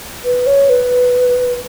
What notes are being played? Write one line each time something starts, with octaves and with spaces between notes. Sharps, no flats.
B4
C#5
B4